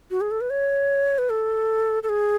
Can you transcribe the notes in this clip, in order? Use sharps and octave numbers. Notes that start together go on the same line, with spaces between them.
F#4
G#4
A4
B4
C#5
B4
A4
A4
G#4